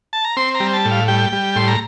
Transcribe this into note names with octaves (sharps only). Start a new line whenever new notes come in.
A5
A#5
C4 C6
A#5
G3
A5
A2
F5
G3 G5
G3
A2 C6
A#5